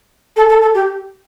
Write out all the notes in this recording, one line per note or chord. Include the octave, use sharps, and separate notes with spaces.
A4
A4
A4
G4